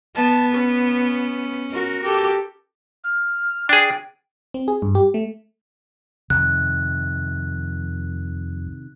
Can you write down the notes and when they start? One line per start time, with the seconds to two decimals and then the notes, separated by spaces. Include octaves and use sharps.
0.16 B3 A5
0.54 C#4
1.71 F#4 A#4
2.03 G4 A4
3.04 F6
3.69 D4 G#4 G5
4.54 C4
4.68 G#4
4.82 G2
4.95 G4
5.14 A3
6.30 F2 C3 D#3 F#6